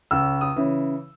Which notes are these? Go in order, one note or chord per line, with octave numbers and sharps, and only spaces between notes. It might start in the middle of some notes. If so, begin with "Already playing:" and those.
C#2 E6
D#6
C#3 E3